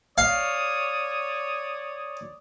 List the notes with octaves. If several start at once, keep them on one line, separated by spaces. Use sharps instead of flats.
C#5 D5 F5 D#6